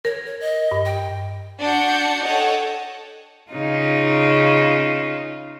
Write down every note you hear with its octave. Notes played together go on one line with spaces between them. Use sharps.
A#4 C#5
C#5
D#5
G2
G5
D4 F#4 F#5 G6 C#7
A4 C#5 D#5 F#5 G5 A5
C#3 D#4 F4